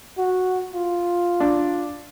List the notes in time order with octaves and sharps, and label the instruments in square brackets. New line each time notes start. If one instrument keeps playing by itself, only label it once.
[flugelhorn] F#4
F4
[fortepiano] D4